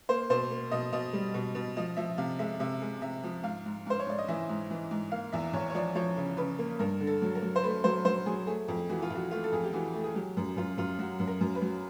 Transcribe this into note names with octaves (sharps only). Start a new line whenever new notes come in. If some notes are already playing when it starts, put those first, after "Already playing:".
A#3 C5
B2 C5
A#3
B2 D#5
B2 D#5
G3
B2
B2
F3 D#5
F3 E5
C3 F5
G#3 E5
C3 E5
G#3
C3 E5
F3
G#2 F5
G#2
G#2 C5
C#5
G#2 D5
D#5
E3 E5
G#2
E3
G#2
A#3 F5
E2 E5
E2 C#5
C#5
F3 D5
F3 C#5
C#3
C#3 B4
A#3
G2 A#4
D3
A4
F#3
A#4
F#3
C5
A3 B4
F#3 C5
F#3 C5
F#3 G#4
A3 G#4
F2
E3 F#4
F4
F2 F#4
A3 F4
A4
F2 G#4
G4
E3 F#4
A3
G#4
F#3 G4
F#2
F#2 F4
F#2 F4
F#3 F#4
F#2
A#4
F#2
B4
F#3